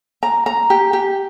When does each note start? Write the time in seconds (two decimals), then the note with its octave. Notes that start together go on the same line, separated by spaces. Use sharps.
0.23 A#5
0.46 A#5
0.70 G4
0.93 G4